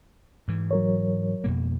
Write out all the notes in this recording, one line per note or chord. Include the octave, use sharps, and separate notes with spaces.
G#2 E3
F#3 A#4 C#5
F2 B2 A#3